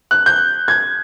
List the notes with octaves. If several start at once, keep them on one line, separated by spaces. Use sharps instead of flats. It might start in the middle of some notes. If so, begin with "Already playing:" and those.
F#6
G6
G#6